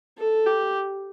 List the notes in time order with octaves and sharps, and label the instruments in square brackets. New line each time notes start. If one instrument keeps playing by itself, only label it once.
[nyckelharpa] A4
G4